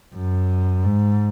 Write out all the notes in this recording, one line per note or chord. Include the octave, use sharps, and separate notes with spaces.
F#2
G#2